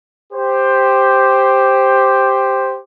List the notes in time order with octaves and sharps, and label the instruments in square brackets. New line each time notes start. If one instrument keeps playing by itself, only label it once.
[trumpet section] G4 C5